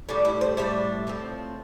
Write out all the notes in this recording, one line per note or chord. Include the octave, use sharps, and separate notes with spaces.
A2 G3 D4 G4
E4
C5
A2 G3 D4 E5
A2 F3 C4